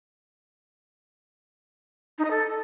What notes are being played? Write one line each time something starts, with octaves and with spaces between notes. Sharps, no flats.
D#4
D#5
A4